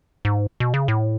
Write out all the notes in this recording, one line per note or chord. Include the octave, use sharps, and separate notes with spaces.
G#2
B2
C#3
A2